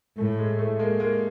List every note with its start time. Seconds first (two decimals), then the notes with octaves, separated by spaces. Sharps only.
0.17 A2 A3
0.38 G#3
0.59 A3
0.79 G#3 A#3
1.00 G#3 A#3